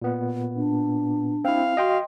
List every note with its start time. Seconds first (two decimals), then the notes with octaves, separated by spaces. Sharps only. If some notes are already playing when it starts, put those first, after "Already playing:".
0.02 A#2 B3
0.55 D4
1.45 C4 E4 F5
1.77 F#4 D#5 G5 C6